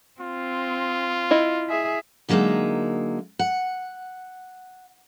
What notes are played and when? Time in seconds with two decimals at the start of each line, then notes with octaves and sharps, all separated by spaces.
0.21 C4 F4
1.31 E4 D#5
1.69 G#4 E5
2.29 D3 F#3 G#3 A#3 D#4 E5
3.39 F#5